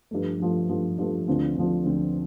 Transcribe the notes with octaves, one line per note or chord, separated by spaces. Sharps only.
G2 F3 A3
G2 F3 A3
G2 F3 A3
G2 F3 A3
D2 D3 F3 C4
D2 D3 F3 C4
D2 D3 F3 C4